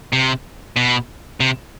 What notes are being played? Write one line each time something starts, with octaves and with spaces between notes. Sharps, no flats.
C3
B2
C3